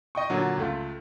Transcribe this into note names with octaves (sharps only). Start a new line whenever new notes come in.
D#5 G5 C#6
A#2 D3 F#3
C#2 A3 F4